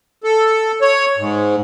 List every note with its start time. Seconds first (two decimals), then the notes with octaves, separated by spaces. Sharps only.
0.24 A4
0.81 C#5
1.18 G#2